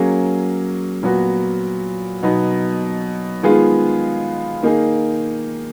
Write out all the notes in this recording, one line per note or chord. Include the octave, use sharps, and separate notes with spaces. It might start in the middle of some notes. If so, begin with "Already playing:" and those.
Already playing: F#3 A#3 C#4 G#4
A#2 F#3 B3 F#4
B2 F#3 B3 D#4
D#3 G#3 B3 F4 G#4
D#3 A#3 D#4 G#4